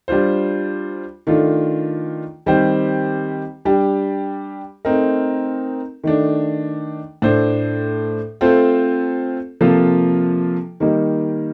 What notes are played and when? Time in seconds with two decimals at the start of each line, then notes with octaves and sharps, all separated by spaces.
0.08 G3 D4 F4 C5
1.27 D#3 A3 D4 F4
2.46 D#3 G3 C4 G4 C5
3.65 G3 D4 G4
4.85 A3 C4 D#4 A#4
6.04 D#3 A3 D4
7.22 A2 A3 D4 A4 C5
8.41 A3 C4 F4 A4 C5
9.61 C3 F3 A#3 F4 A4
10.80 D#3 G3 A#3 D#4